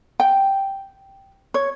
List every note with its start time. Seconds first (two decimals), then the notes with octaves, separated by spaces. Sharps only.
0.20 G5
1.54 C#5